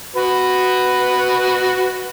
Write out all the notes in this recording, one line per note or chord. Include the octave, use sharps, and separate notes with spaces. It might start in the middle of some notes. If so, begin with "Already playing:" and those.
F#4 B4